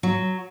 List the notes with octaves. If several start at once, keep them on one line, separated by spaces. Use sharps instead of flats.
F#3